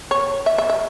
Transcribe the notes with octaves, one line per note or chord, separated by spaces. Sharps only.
C#5
E5
E5
E5